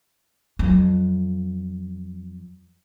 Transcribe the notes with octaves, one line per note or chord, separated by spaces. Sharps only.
F2 F#3